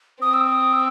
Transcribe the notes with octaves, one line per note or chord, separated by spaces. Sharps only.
C4 D#6
E6
D#6
E6